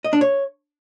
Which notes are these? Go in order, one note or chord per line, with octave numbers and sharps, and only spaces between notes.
D#5
D4
C#5